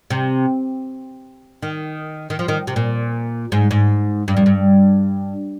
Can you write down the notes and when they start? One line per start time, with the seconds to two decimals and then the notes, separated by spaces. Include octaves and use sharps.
0.10 C3
1.62 D#3
2.30 D#3
2.39 F3
2.48 D#3
2.67 C3
2.76 A#2
3.52 G#2
3.71 G#2
4.28 G2
4.37 F2
4.46 G2